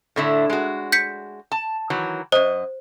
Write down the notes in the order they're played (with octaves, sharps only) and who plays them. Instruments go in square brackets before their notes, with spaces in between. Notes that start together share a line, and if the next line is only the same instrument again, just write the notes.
[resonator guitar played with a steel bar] A2 D3 E4
G#3 F#4
[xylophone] G6 B6 C#7
[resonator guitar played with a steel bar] A5
D#3 E3 F#3
[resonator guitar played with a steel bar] F#2 D#5 [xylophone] C5